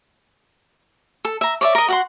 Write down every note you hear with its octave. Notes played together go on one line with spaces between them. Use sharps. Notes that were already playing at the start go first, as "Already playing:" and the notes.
A4
E5 A#5
C#5 D5 E5
A#4 D#5
F#4 F#5 C6